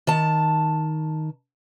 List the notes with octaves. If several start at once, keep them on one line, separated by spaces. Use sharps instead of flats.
D#3 A5